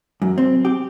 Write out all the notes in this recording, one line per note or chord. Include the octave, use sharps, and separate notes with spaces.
F#2
C4
G4